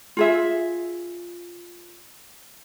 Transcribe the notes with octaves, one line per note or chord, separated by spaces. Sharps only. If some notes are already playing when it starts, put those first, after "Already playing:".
F4 G#4 E5